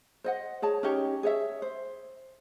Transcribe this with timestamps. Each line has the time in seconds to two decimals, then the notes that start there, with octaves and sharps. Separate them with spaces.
0.24 C5 D#5 F#5
0.62 G#4 C#5 A5
0.83 C#4 D#4 G4 C#5
1.23 G#4 C#5 E5
1.62 C5